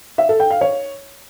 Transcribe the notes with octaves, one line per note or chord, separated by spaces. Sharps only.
E5
A4
G5
F5
C#5